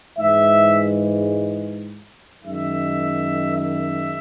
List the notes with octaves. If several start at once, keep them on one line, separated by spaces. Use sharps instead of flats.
G#2 E3 G#3 E5
F#2 D#3 G#3 E5
E5